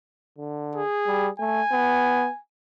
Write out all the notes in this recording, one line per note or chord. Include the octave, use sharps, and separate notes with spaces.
D3
G#4
G3
A3 G#5
B3